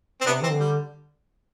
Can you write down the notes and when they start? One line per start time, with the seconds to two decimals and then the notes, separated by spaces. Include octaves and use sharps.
0.21 C4
0.26 C3 B3 D4
0.41 E3 C4
0.51 D3
0.60 G3